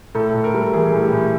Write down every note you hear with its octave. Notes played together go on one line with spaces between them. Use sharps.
A2 A4
A2
A#4
G3
E3 G#4
A2
G4
A2